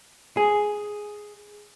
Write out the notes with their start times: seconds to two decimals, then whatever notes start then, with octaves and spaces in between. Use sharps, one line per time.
0.37 G#4